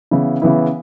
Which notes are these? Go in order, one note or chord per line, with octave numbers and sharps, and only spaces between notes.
C#3 E3 B3 E4
C#3 E3 B3 E4